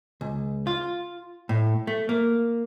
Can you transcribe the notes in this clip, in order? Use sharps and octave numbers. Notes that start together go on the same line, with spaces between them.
C#2
F4
A2
A3
A#3